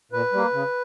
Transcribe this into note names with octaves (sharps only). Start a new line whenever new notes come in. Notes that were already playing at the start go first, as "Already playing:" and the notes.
A#2 B4
G3 A#3
C#3